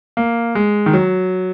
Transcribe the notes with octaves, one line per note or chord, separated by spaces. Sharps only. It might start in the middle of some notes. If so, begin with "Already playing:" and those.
A#3
G#3
D#3
F#3